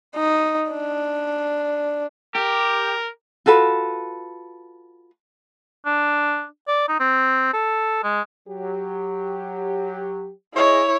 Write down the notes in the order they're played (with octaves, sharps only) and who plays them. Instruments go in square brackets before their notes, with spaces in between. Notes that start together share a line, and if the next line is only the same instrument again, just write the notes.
[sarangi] D#4
D4
[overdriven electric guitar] G4 [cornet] A#4
[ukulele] F4 F#4 A4 B4
[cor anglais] D4
D5
D#4
C4
A4
G#3
[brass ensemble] F#3 G4
[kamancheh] E4 C#5 [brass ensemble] G#4 D#5